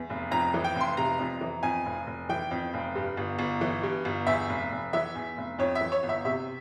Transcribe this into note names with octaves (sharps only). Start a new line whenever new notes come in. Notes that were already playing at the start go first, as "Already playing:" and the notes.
Already playing: E2
F1
F2 A#5
E3
G5
F1
C6
C3 A#5
F2
E3
F2 G#5
F1
F1
E3 G5
F2
F1
G2
G1
G1
E3
G2
G1
E2 E5
F1
F1
E3 E5
E2
F1
F2 C#5
E5
E3
C#5
G1
E5
C3 E5